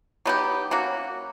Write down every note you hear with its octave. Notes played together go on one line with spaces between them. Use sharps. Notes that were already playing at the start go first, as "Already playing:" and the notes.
F#3 B3 D#4 G4
F#3 A#3 C#4 F#4